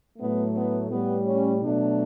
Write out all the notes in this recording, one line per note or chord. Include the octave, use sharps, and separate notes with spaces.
A2 F#3 A3 B3
B3
A2 G3 B3
C#4
B2 F#3 A3 D4